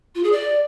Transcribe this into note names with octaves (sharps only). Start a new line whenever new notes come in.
F4
G#4
D5